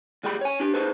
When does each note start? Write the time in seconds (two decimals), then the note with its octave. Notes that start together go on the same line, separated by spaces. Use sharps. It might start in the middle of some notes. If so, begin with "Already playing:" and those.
0.23 D#2 G3 G#4 G5 B5
0.41 C#5 G#5
0.60 D4 G4
0.74 D#4 G#4 A4 B4 C5